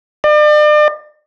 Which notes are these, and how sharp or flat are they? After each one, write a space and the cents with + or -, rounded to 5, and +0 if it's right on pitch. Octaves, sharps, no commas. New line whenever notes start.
D5 +40